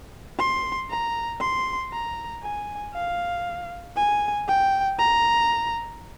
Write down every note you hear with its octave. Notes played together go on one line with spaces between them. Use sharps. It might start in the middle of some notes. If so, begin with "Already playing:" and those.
C6
A#5
C6
A#5
G#5
F5
G#5
G5
A#5